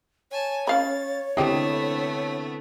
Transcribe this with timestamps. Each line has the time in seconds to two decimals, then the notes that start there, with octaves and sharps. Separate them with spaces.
0.31 C#5 G#5 A5
0.67 C#4 F5 B5 A6
1.37 D3 G#3 A3 B3 C4 E4 G4